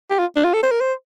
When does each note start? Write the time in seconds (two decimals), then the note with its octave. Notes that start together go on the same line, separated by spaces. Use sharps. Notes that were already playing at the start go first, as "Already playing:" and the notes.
0.10 G4
0.19 F4
0.36 D4
0.45 F4
0.54 A4
0.63 C5
0.72 A#4
0.81 C5